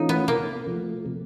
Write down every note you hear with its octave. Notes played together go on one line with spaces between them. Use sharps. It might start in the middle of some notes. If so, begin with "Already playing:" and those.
Already playing: E3 A3 C#4 D#4 F4
B3
C3 A#3
F3 A3
C3